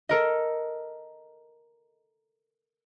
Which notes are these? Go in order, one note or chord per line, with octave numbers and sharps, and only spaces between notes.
A4 A#4 D#5